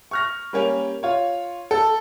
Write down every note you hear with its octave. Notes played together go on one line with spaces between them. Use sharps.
C#6 F6 A#6
G3 A#3 C#4
F4 C#5
A4